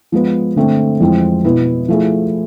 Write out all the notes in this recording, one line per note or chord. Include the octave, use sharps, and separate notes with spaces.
F3 G#3 B3
D3 A3 C4
F2 E3 G#3 C4
B2 B3 E4
F3 A3 E4 G#4